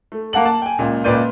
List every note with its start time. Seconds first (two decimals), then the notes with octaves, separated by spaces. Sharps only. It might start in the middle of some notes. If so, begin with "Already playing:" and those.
0.12 A3
0.33 A#3 F#5 A5 F#7
0.45 A5
0.62 G5 G#5
0.78 C#2 A#2
1.04 C#2 A#2 B4 D5 G6 D#7